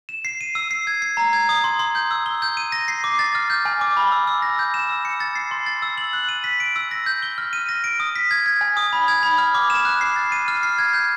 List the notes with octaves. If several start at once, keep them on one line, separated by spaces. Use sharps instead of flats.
E7
C7
D#7
E6
C7
G#6
C7
A#5
G#6
D#6
C6
C6
G6
E6
G7
G6
D#7
A#6
C7
D6
A6
F6
G6
G#5
D6
B5
E6
E6
A#6
G6
E7
E6
C#7
A6
C7
C6
A6
E6
F#7
F#6
D#7
B6
D7
E6
A#6
G6
G7
F6
D#7
A#6
D7
D#6
B6
G#6
G#6
G#5
D#6
B5
G#6
B5
F6
D6
E7
F#6
C7
A6
D#7
F6
C7
G#6
G6